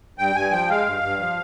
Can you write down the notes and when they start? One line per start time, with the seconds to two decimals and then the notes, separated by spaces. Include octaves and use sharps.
0.18 G2 G5
0.35 G2 G#5
0.52 F3 G5
0.69 G#3 F5
0.86 G2
1.03 G2
1.20 F3